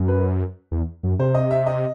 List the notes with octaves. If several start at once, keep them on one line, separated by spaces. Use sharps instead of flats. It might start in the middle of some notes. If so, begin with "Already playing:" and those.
Already playing: F#2
B4
E2
F#2
C3 C5
D#5
E5
D#5